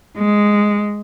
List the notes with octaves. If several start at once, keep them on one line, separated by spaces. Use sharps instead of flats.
G#3